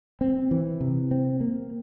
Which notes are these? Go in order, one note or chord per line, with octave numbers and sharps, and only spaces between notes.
C4
E3
C3
C4
A#3